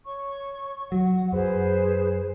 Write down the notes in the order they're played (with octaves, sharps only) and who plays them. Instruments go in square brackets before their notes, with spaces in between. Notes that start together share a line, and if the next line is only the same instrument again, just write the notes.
[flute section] C#5 C#6
[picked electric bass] F#3 [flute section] F#5
[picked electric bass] F#2 [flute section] G#4 B4 C5